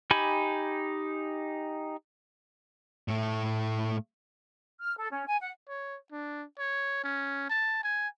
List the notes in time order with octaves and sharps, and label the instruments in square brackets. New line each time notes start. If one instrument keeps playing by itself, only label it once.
[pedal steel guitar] D#4 G4 G#5 B5
[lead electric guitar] A2 A3
[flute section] F6
A4
C#4
G#5
F#5
[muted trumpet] C#5
D4
C#5
C#4
A5
G#5